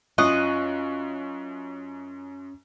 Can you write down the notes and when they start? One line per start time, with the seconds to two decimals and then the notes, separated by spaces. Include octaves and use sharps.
0.18 F#2 C#4 F4 D#5 C#6 F#6